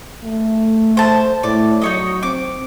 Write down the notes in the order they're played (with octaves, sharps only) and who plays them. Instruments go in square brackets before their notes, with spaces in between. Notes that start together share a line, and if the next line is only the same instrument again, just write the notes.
[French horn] A3
[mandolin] C5 A5
[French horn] A2 [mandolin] D5
[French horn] F#3 [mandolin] D#4 C#5 D#5
[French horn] C4 [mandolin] D6